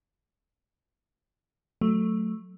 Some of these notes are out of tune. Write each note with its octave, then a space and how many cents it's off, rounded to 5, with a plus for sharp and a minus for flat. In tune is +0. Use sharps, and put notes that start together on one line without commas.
F#3 -10 A3 +0